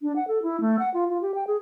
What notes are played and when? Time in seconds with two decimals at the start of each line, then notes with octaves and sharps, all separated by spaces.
0.01 D4
0.16 F#5
0.28 A4
0.43 E4
0.60 A3
0.79 F#5
0.94 F4
1.10 F4
1.22 G4
1.35 G5
1.47 G#4